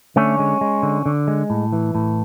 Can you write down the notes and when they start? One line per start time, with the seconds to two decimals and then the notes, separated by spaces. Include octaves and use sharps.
0.16 D3 A3 C#4
0.39 G#3
0.61 G#3
0.83 D3
1.06 D3
1.28 G#3
1.50 A2
1.73 E3
1.95 A2